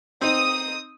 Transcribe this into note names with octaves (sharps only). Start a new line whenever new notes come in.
C4 D#4 D#6